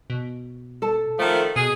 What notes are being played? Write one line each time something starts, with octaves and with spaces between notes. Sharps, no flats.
B2
A4 A5
D#3 F3 A3
B2 G#4